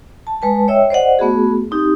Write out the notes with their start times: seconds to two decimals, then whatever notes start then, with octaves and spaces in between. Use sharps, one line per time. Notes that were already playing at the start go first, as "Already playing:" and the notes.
0.27 A5
0.42 G#3 B4 A5
0.68 C#5 D#5 E5 G5 E6
0.90 C5 D5 D#5 F#5
1.19 A3 B3 F#4 G#4
1.71 C4 D#4 G4